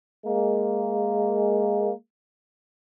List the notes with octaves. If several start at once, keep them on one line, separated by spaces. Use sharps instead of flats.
G#3 A#3